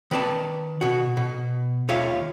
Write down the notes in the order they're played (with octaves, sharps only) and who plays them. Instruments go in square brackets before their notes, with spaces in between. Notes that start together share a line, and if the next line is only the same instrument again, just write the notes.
[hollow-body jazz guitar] D#3 B4 D5 A5
B2 F#4
B2
D#2 F4 C#5 E5 F5